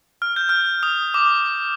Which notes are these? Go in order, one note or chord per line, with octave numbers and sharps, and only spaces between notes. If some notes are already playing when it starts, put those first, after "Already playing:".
F6
G6
F6
D#6
D6